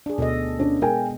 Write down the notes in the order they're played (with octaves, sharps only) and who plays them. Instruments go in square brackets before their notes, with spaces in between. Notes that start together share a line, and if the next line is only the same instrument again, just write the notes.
[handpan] D4 G#4
[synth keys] D2 [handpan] B2 A4 D#5
[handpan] B3 [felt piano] C#4 D4
[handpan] G#3 [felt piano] G#4 G5 G#5 [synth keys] A#4